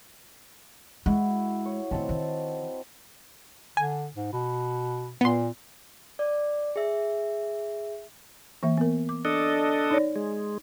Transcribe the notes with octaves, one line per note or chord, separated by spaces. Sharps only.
G#3 C#4 E4 F#4
C#5
D#3 A3 C4 D#5 A5
D#3
D3 G#5
G#2
B2
A#2 B3 C6
D5
G#4 E5
E3 A#3 E5
B3 A#4
D6
D4 A4 D#5
D#4 C#5 D5
G#3